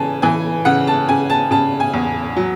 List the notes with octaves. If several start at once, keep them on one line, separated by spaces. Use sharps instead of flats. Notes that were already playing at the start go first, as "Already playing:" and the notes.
Already playing: C#3 E3 G#5 A5
E3 G#5
C#3 F#5
A5
C#3 G#5
A5
C#3 A5
G#5
E2
F#3